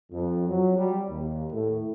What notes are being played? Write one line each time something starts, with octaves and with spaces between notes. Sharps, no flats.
F2
F#3
G3
D#2
A2